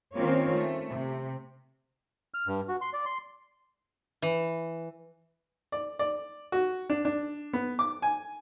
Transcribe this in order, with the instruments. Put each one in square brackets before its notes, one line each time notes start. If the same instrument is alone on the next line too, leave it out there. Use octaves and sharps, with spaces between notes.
[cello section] D#3 A#3 C4 C#4 F4 C#5
A3
C3
[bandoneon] F6
G2
F#4
C6
D5
C6
[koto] E3
[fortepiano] D5
D5
F#4
D4
D4
B3
D6
G#5